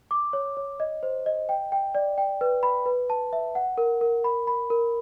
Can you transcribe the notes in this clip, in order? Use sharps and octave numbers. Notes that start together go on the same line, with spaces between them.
D6
C#5
C#5
D#5
C5
D#5
G5
G5
D5
G5
B4
B5
B4
A5
E5
F#5
A#4
A#4
B5
B5
A#4